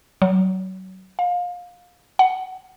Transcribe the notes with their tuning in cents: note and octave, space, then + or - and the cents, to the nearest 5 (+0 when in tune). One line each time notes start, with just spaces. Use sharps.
F#3 +25
F5 +25
F#5 +15